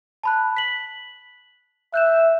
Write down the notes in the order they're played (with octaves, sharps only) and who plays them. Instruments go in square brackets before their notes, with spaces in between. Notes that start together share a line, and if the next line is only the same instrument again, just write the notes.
[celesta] A5 B5 F#6
B6 F#7
[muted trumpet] E5 [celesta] F#6 G6 E7